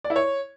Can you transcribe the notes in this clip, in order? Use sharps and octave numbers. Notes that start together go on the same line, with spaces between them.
D5
E4
C#5